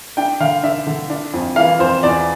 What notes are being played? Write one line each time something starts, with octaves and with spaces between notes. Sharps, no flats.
D4 G5
D3 F5
D4 E5
D3
D4
F2
E3 F5
F2 C5
E2 D5